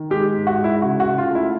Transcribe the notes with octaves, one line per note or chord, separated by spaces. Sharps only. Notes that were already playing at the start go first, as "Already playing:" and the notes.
Already playing: D#3
G#3 G4
G#2
F#4
G#3
E4
C#3 F#4
F#4
C#3
F4
A3
E4